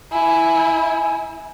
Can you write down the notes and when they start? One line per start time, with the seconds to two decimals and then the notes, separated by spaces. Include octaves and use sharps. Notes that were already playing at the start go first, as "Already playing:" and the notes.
0.12 E4 G#5